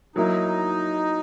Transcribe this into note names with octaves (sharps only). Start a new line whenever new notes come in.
F#3 A#3 D#4 E4